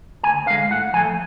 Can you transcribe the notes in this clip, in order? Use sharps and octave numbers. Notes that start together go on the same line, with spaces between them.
D2 G#5
D3 G#3 F5
A2 F#5
F3 A3 G#5